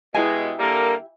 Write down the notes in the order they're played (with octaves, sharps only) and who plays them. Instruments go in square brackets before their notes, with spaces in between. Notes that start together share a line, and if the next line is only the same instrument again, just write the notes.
[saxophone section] B2 G#3 [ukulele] E4 G4 G#5
[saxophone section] D3 G3 A#3 [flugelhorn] A#4